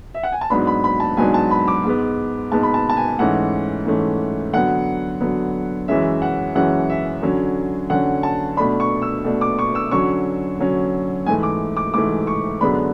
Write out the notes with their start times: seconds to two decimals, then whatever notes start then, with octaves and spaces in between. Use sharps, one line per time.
0.14 E5
0.23 F#5
0.32 G#5
0.41 A5
0.50 G#2 F#3 B3 D4 B5
0.67 B5
0.84 B5
1.00 A5
1.17 G#2 F#3 B3 D4 G#5
1.34 A5
1.51 B5
1.68 D6
1.84 G#2 G#3 B3
2.52 G#2 G#3 B3 A5
2.63 B5
2.74 A5
2.89 A5
2.97 G#5
3.19 G#2 E3 A3 C#4 F#5
3.86 G#2 E3 A3 C#4
4.53 D3 F#3 B3 F#5
5.20 D3 F#3 B3
5.88 F#2 E3 G#3 C#4 E5
6.22 F#5
6.55 F#2 E3 G#3 C#4 F#5
6.90 E5
7.23 D3 F#3 C#4
7.90 D3 F#3 C#4 F#5
8.23 A5
8.57 B2 A3 D4 B5
8.80 C#6
9.02 E6
9.24 B2 A3 D4
9.41 D6
9.59 C#6
9.75 E6
9.91 D3 F#3 C#4 C#6
10.59 D3 F#3 C#4
11.26 G#2 E3 A3 G#5
11.43 D6
11.77 D6
11.94 G#2 E3 A3 D6
12.27 C#6
12.61 F#2 D3 G#3 B3 D4 B5